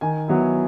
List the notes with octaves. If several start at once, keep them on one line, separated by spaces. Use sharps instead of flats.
D#3 G#5
F#3 B3 E4